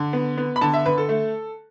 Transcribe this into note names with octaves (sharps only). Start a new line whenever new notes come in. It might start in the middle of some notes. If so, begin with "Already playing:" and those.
Already playing: D3
B3
B3
B5
D3 A5
E5
D3 B4
A4
A3